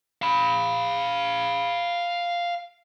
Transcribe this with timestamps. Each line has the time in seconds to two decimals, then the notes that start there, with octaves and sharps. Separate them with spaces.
0.22 F5 B5